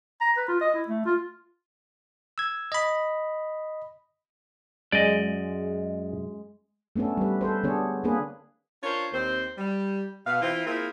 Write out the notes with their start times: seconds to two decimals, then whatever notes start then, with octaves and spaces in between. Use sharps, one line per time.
0.21 A#5
0.37 B4
0.48 F4
0.61 D#5
0.74 E4
0.88 A3
1.06 F4
2.38 E6 G#6
2.72 D#5 B5
4.92 F#2 G#3 D5 D#5
6.96 A3 B3 C#4 D4 A4
7.17 G3 B4
7.41 A4 B4 C5
7.63 D3 B3 D4 G#4 C#5
8.04 A#3 C4 D4 G#4 B4
8.83 D4 F4 A#4 C5 C#5
9.13 D#2 C4 C5
9.58 G3
10.26 B2 B3 F5
10.41 E3 C4 E4 F4 C5
10.66 A#3 C4 E4 F4 G#4 A#4